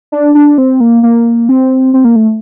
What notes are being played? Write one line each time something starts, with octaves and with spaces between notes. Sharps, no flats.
D4
D4
C4
A#3
A#3
C4
C4
A#3
A3